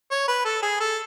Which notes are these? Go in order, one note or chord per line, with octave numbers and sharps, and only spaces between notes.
C#5
B4
A4
G#4
A4